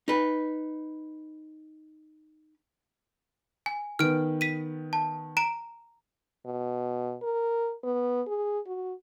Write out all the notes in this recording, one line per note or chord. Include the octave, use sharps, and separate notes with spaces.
D#4 B4
G#5
D#3 B3 F6 D7
B6 D#7
A5
A#5 D7 E7
B2
A#4
B3
G#4
F#4